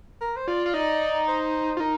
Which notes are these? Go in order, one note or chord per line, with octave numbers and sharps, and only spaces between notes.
A#4
C5
F4 D5
F4
D#4 D5
C5
F4
D#4 A#4